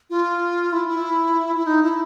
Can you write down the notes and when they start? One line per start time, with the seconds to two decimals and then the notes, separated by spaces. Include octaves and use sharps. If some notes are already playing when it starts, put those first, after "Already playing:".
0.10 F4
0.72 E4
0.88 E4
1.56 E4
1.67 D#4
1.83 E4